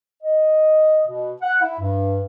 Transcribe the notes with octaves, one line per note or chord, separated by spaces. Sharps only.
D#5
B2
F#5
E4
G2